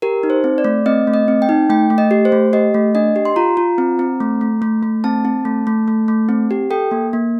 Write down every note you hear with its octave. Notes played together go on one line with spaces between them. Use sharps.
G4 A#4
D#4
C5
C4
D5
A3
C4 D#5
A3
D#5
C4
G5
D#4
A3 G5
A3
D#5
G4
C5
A3
G4 D#5
A3
D4 D#5
G4
C6
F4 A#5
F4
C4
C4
A3
A3
A3
A3
C4 A5
C4
A3
A3
A3
A3
C4
G4
A4 G5
A#3
A#3